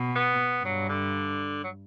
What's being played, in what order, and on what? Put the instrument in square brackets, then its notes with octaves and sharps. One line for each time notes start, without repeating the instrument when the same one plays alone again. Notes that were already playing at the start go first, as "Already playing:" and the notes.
Already playing: [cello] B2
[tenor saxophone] B3
[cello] G2 [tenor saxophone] F#3
[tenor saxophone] D3
F#3